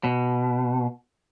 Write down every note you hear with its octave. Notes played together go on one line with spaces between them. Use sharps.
B2